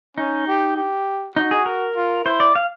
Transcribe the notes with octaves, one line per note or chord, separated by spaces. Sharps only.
C#4 D#4
G4
G4
D#4 F#4
G#4
A#4
F4
E4 C5
D5
F5